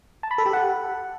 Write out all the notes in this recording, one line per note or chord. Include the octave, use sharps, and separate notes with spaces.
A5
B5
A4
G4
F#5